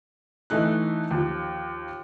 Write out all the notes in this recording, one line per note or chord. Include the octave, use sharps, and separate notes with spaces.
E3 A3 D#4 F#6
D#2 F3